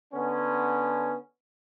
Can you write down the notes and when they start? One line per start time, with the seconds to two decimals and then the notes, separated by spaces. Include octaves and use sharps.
0.13 D3 B3 C#4